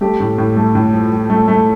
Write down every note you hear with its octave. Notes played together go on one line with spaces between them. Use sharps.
A3 G4
A2
A2
A3
A2
F3
F3
A3
A3